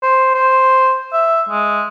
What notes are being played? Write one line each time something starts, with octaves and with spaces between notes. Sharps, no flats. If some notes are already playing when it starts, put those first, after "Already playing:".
C5
C5
E5
G#3